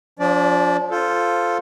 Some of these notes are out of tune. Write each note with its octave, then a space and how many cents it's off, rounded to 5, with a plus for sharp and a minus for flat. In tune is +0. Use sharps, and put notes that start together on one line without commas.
F3 +20 D4 -35 D5 +0
F4 +0 A4 +0 C5 +0